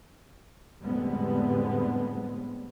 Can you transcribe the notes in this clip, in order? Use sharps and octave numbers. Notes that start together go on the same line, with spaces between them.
F2 A2 D3 G3 G#3 B3